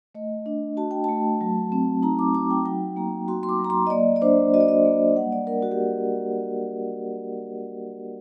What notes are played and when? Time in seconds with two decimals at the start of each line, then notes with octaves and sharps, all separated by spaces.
0.15 A3 D#5
0.46 D4
0.77 F#4 A5
0.91 G5
1.04 A3 A5
1.41 F#3
1.72 C4
2.02 D#4 A#5
2.19 D6
2.34 F#4 D6
2.50 G5
2.66 F#3 G5
2.96 A#3 A#5
3.28 F#4 C6
3.43 C6
3.49 D6
3.59 F#3
3.64 A#5
3.70 C6
3.87 D#5
3.90 A#3 D5
4.16 D5
4.22 D4 C5
4.54 F#4 D#5
4.61 D5
4.68 D#5
4.85 A#3
5.16 G3 F#5
5.32 D5
5.47 D4 A#4
5.63 F#4
5.71 G4